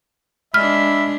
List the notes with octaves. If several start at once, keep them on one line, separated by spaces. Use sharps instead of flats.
G#3 D4 E5 B5 F6